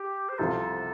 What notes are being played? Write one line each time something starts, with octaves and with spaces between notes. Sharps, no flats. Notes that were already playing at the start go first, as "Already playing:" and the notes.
Already playing: G4
C5
C2 C3 F3 C4 F4 A4